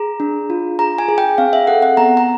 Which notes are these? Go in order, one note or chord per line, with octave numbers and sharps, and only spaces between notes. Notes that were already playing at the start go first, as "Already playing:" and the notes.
Already playing: G#4 A#5
D4
F4
G#4 A#5
G#5
G#4
G5
C4 F5
E5
A4 F#5
F#5
B3 A#5
A#5